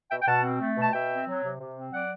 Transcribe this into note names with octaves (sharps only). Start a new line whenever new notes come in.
B2 E5 G5
G5
B2 F#5 A5
C4
A3
B2 A5
B2 E5 G5
C4
F#3
C3
C3
C4
F#3 D5 F#5